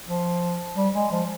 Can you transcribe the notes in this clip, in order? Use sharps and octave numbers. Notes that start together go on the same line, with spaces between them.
F3
G3
G#3
F3